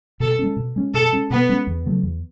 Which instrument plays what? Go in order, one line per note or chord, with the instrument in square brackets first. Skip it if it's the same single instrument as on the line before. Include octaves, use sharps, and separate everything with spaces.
[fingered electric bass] B2 [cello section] A4
[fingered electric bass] G#3 C#4
B2
G#3 C#4
[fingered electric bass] B2 [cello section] A4
[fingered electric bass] G#3 C#4
[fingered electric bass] B2 [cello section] B3
[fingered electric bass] G#3 C#4
E2
C#3 F#3 A3
E2